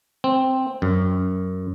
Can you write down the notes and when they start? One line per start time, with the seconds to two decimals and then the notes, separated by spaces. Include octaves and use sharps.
0.24 C4
0.82 F#2